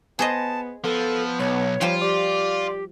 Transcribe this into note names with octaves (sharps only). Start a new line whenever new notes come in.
B3 G#4 C5 D#5 A5
F3 B3 A4
B1 C#5
F3 G3 F4 C5
G4 D5